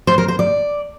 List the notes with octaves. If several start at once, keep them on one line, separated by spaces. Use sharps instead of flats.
C5
A#4
C5
D5